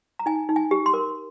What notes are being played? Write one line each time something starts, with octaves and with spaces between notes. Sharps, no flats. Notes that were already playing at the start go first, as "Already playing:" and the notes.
A#5
D#4 G#5
D#4
G#5
G4
C6
A#4